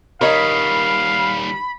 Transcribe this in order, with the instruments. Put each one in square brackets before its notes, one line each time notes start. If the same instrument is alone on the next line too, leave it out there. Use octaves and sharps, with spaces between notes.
[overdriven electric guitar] D#3 G3 [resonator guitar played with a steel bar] A#4 C#5 D#5 [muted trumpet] F5 [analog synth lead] B5